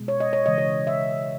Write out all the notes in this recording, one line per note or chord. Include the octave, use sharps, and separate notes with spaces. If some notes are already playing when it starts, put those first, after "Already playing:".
Already playing: B2 G#3
C#5
D#5
C#5
C#3 E3 G#3 D#5
C#5
E5